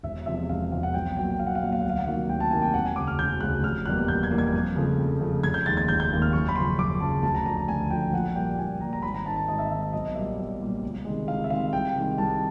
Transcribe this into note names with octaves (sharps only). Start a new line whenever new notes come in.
E1 E5
E2 C3 F3 G#3 E5
E1 F5
E2 C3 F3 G#3 F5
F#5
B1 G5
A#2 F#3 A#3 G5
B1 F5
F#5
F5
A#2 F#3 A#3 F#5
F5
D2 F#5
F5
F#5
C3 D#3 F#3 A#3 F5
D2 G5
A5
C3 D#3 F#3 A#3 G#5
G5
E1 F#5
G#5
D2 C#3 D6
F6
E1 G6
D2 C#3 F#6
F1 F6
E2 B2 G3 A#3 F#6
F1 G6
G#6
E2 B2 G3 A#3
G#6
F2
C#3 F3 A3
F2
C#3 F3 A3
F1 G#6
G6
D#2 D#3 G#3 A6
G#6
F1 G6
G6
D#2 D#3 G#3
F6
F#2 C#6
B5
C#3 F3 C6
F#2 D6
C#3 F3 A5
D2 A5
A#5
D3 F3 A#5
A5
D2 G#5
D3 F3 G5
A#1 F#5
A#2 G3 A#3 G5
A#1 G#5
A#2 G3 A#3 A#5
A#5
G#1 B5
A#5
G#2 D#3 A5
A5
G#1 D#5
E5
G#2 D#3 E5
B1 D#5
A#2 G3 A#3 E5
B1
A#2 G3 A#3
C#2
C3 D#3 G#3
C#2 F5
E5
C3 D#3 G#3 F5
C2 G5
C3 D#3 G#3
C2 A5